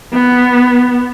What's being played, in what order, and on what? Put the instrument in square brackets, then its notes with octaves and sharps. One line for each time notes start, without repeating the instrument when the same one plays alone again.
[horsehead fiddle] B3